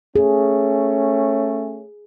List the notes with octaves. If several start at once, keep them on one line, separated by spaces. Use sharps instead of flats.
A3 C#4 G#4